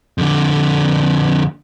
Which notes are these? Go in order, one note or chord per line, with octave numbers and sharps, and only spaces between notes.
F2 D3